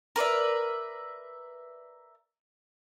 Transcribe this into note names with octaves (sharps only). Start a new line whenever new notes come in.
A#4 B4 D5 E5